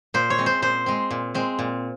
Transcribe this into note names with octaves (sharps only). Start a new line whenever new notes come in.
A#2 C5
C#5
G#3 C4
C5
A#2 C5
G#3 C4
A#2
G#3 C4
A#2